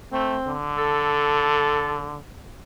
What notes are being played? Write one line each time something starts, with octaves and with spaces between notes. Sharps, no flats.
A3 C4
D3
A4